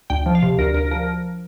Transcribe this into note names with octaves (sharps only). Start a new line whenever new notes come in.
D2 G5
F3
F5
C3
D2 A#4
D2 A#4
F3 A#4